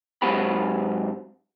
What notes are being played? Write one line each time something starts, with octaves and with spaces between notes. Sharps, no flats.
G#2 F#3 C4 F#4 G4 B5